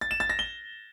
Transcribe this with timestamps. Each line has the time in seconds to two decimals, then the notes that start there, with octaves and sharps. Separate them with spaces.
0.01 A6
0.11 E7
0.20 A6
0.30 A#6
0.39 G7